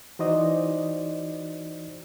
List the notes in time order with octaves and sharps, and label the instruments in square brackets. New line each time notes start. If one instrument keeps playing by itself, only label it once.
[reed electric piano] E3 D#4 F#4 C5 D5 D#5